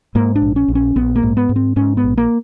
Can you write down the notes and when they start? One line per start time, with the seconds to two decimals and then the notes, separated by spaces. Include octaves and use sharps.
0.15 G#2 A#3
0.35 D4
0.42 A#1
0.56 C#4
0.68 A#1
0.75 C#4
0.96 A#1 B3
1.16 A#3
1.23 G#2
1.37 B3
1.49 G#2
1.56 C4
1.76 G#2 C#4
1.97 B3
2.04 A#1
2.17 A#3